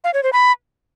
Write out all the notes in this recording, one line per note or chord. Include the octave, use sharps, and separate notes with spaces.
F5
C#5
C5
B5